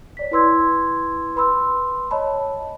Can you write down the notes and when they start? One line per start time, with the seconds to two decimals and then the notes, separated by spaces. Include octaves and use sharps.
0.17 C#5 D5 B6
0.31 E4 B4 C6 E6 G#6
1.36 B4 B5 C6 E6
2.11 C#5 D#5 A5 B5